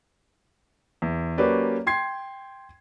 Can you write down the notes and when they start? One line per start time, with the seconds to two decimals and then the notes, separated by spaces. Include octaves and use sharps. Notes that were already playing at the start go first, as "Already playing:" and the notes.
1.02 E2
1.38 F#3 A#3 C#4 G4 B4 D5
1.87 G5 C6 G#6 C7